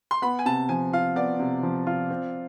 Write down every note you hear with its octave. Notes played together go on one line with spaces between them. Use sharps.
C6
B3 B5
G#5
C3 A5
F3 G#5
F4 F5
B3 D5
C3
F3
F4
C4